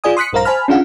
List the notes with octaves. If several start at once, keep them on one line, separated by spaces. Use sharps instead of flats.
F4 G#4 D5 G#5 D#6
C6 D#6 F#6 B6 C#7
A#1 G2 A#4 C5 F5 A#5
C5 G#5 A5 B5 F6
C#4 D4 F4 G#4 F5 F#5